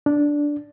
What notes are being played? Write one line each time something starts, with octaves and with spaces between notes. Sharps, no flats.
D4